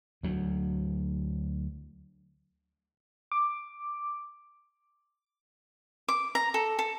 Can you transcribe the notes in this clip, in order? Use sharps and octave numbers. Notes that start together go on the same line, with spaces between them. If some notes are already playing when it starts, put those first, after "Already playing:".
D2 F#3
D6
D6
A#5
A4
A4